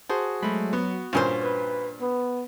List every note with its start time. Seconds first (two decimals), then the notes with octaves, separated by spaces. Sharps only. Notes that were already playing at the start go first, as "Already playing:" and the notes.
0.09 F#4 G#4 C5 A5
0.43 F#3 G#3 A3 B5
0.73 B3 F#4
1.13 G2 A#2 F3 C#4 C5
1.43 B4
2.01 B3